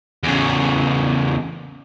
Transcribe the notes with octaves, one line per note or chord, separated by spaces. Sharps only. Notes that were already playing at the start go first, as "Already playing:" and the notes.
E2 C#3